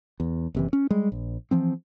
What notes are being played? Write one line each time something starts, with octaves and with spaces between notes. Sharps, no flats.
E2
F#1 C3 E3
C#4
G3 G#3
A#1
E3 F3 C4